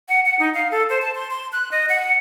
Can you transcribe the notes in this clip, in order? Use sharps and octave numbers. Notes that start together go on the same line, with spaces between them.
F#5
F#5
D#4
F5
A4
C5
A5
C6
C6
F#6
D#5
F#5